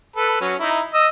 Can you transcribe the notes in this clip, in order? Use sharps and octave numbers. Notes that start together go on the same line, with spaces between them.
A4 B4
F#3 C#4
D#4 E4
D#5 E6